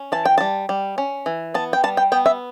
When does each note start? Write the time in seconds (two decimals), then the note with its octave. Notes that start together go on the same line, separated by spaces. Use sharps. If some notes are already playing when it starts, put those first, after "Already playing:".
Already playing: C#4
0.12 E3 A5
0.25 G5
0.38 G3 A5
0.69 G3
0.98 C#4
1.26 E3
1.54 B3 A5
1.73 G5
1.83 G3 A5
1.97 G5
2.12 B3 G5
2.26 E5